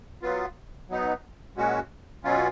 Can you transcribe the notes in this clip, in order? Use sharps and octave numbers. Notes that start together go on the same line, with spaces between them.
F#3 B3 F4
F#3 B3 D#4
A#2 G#3 C#4 F#4
B2 F#3 C#4 F4